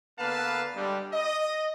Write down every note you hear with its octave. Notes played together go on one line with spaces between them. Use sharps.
D3 A#3 B3 B4 F5 A5
D3 G3 G#3
D#5